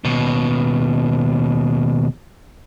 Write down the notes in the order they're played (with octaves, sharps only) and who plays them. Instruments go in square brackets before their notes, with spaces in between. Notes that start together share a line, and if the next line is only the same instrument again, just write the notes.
[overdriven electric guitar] D#2 B2